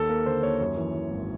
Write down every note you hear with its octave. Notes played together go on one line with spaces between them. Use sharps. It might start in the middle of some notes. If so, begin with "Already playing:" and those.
Already playing: D#2 A4
A#3 A#4
D3 C5
D#2 C#5
F#2
E3
E3
G#1